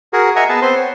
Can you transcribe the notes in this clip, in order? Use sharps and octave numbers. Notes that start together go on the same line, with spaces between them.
F#4 G#4 A#4
D#5 E5 F#5 G#5 A#5
B3 G#4 B4 A5
B3 C4 C5 C6
C#5